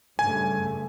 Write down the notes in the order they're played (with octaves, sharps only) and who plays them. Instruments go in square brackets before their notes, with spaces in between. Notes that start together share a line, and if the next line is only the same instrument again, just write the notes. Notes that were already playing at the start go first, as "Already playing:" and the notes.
[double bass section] G2 C#3 A3 [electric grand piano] G#5